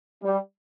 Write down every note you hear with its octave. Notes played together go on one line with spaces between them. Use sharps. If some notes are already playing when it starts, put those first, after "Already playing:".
G3